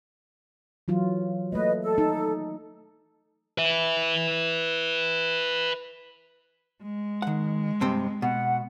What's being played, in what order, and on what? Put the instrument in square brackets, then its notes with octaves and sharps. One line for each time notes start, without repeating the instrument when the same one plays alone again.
[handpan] E3 F#3 F4
[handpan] A3 A#3 [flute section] B4 D#5
[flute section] A4
[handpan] D#4
[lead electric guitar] B4 E5
[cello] G#3
[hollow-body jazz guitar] D#3 F#5
G2 C3 C4
[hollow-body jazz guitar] B2 [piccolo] F#5